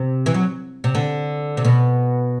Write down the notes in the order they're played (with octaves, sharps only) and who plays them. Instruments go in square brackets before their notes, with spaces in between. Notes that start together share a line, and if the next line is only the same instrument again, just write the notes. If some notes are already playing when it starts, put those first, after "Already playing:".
Already playing: [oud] C3
E3
F#3
C3
D3
C3
B2